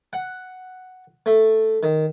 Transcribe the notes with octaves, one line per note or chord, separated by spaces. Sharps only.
F#5
A3
D#3